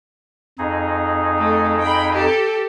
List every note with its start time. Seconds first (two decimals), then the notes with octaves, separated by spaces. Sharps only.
0.59 F2 D#4 G#4
1.38 A3
1.82 G5 B5
2.13 G4 A4